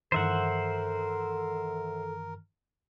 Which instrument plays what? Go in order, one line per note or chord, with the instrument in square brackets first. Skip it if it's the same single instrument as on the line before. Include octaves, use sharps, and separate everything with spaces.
[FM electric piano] G2 D#3 E3 [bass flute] A4 [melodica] A#4 [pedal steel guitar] C5 E5 F#5